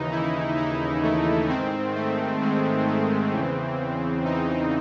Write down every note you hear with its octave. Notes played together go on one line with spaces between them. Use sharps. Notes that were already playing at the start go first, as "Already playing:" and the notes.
Already playing: D#2 C#3 E3 D#4
E4
D#4
A3
G#2 D#3 C4
A3
G#3
C4
E2 C#3 E3
D#4